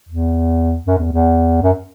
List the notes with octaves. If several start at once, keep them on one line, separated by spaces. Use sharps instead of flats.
E2
F#2
E2
E2
F#2